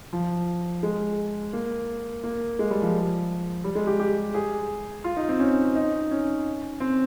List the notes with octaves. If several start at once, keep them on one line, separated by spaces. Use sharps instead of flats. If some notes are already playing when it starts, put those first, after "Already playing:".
F3
G#3
A#3
A#3
G#3
G3
F3
G3
G#3
G4
G4
G#4
F4
D#4
C4
C#4
D#4
C#4
C4